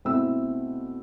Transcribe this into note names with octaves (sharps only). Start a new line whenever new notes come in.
B2 A3 C4 E4 E6